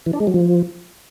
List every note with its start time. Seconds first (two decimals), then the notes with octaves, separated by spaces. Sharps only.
0.06 E3
0.13 D4
0.20 G#3
0.27 F#3
0.34 F3